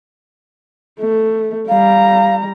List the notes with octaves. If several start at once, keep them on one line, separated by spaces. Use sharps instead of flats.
A3
G3 F5 A#5